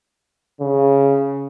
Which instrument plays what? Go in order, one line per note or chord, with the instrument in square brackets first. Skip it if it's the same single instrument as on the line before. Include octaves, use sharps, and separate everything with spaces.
[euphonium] C#3